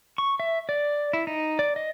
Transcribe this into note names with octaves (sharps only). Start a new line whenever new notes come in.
C#6
E5
D5
E4
D#4
D5
D#5